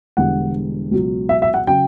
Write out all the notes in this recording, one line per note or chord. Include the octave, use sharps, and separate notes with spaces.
E1 E2 D3 G3 F#5
C#2 B2 F#3
E5
E5
F#5
C#3 F#3 G5